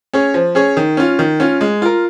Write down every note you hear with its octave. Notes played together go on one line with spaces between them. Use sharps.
C#4 G#4 C#5
F3
C#4 G#4 C#5
D#3
C#4 F4
D#3
C#4 F4
G#3
F4 A#4